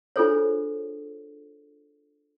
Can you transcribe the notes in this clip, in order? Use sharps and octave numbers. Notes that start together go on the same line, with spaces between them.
D4 F4 G#4 A4 C5 C#5